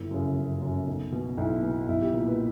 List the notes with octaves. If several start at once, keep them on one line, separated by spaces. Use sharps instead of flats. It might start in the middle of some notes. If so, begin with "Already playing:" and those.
Already playing: G1 E4
F#2 C#3
G1
F#2 C#3
B1
B2
B1 E4
B2
B1 E4
G4
A#2 A#4
B4